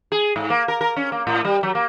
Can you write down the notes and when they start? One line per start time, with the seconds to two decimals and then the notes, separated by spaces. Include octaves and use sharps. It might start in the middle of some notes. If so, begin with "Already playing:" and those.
0.12 G#4
0.36 G#2
0.50 A#3
0.68 A#4
0.81 A#4
0.96 C#4
1.12 A#3
1.27 A2
1.45 G3
1.63 F#3
1.75 A#3